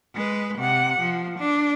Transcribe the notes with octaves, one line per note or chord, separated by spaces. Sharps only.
G#3 B4
C3 F#5
F3
D4